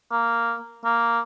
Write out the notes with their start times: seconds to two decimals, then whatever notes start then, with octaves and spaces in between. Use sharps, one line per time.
0.12 A#3
0.85 A#3